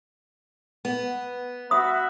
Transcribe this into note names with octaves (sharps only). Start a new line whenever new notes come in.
B3
F#4 E5 B5 D#6